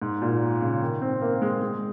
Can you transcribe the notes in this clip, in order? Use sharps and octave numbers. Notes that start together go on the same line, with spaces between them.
G#2
A#2
C#3
D#3
C4
A#3
G#3
G#3